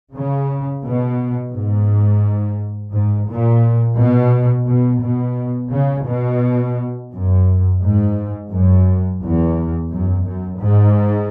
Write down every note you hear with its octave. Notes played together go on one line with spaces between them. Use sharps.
C#3
B2
G#2
G#2
A#2
B2
B2
B2
C#3
B2
F#2
G#2
F#2
E2
F#2
F#2
G#2